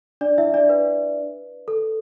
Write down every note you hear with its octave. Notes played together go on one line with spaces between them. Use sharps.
D4 D5
E4 E5
D4 D5
B4
A4